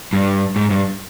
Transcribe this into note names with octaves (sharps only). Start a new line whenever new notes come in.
G2
G#2
G2